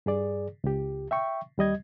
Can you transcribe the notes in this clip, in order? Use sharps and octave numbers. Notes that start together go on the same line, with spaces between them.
G2 G#4 D5
C#2 G4
E5 G5 C#6
D#2 G3 D#5 G#6